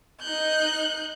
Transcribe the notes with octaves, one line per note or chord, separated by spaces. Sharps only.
D#4 F#6 G6